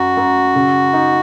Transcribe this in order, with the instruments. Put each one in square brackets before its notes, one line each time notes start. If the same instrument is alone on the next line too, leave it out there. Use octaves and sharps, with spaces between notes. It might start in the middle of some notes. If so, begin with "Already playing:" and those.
Already playing: [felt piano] F#2 [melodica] F#4
[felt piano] F#2
C#3
D#4